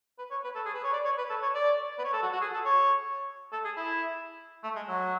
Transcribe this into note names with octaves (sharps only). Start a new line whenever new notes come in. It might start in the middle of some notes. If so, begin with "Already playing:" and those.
B4
C#5
B4
A4
G#4
B4
C#5
D5
C#5
B4
A4
C#5
D5
B4
C#5
A4
F#4
F#4
G#4
A4
C#5
A4
G#4
E4
A3
G#3
F#3